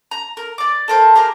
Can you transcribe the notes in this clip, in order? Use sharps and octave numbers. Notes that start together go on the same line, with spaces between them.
A#5
A#4
D5 D6
A4 A#4 C5
G4 G#4 A#4